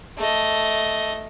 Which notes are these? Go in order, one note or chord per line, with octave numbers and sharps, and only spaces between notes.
A3 D#5